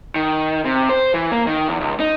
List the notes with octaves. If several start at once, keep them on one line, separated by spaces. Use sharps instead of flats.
D#3
C3
C5
E3
A#3
D#3
E2
C#2
D#4